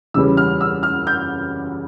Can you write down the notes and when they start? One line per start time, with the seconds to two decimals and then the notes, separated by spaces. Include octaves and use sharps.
0.14 E2 C#3 E3 G3 C#4 E6
0.37 F6
0.61 E6
0.83 F6
1.07 G6